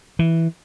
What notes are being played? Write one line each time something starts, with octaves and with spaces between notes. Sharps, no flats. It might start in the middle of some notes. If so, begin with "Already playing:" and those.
E3